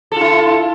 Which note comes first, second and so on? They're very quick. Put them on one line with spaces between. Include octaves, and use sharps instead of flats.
A4 F4 E4